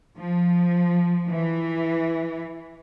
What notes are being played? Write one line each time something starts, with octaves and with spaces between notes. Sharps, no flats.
F3
E3